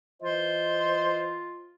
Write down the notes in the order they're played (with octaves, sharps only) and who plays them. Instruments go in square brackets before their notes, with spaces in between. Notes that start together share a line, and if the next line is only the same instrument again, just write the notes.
[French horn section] E3 D#5 [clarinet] F4 [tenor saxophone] C5